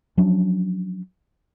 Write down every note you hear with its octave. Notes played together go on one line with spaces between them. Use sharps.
F3 F#3 C#4 D4